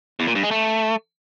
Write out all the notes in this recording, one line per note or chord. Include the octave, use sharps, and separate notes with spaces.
E2
A#2
G2
G#3
A3